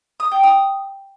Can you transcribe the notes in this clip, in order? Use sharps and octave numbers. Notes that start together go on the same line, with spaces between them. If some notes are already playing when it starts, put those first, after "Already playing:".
D#6
G5
D#6